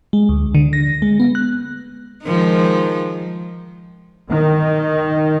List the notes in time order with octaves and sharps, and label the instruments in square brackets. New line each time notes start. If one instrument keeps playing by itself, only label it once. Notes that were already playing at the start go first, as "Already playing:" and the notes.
[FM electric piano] G#3
D2
D3
A#6
G#3
B3
F#6
[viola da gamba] D#3 F3 G#3
[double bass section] D#3